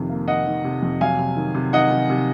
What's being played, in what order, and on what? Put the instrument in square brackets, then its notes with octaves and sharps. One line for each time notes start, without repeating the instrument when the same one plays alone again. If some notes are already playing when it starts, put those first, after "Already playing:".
Already playing: [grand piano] F2 C3 D#3
A#3
D#3 D#5 F#5
D#3
C3
F2
F#3 F5 G#5
C3
D#3
C3
D#3 D#5 F#5
C3
C3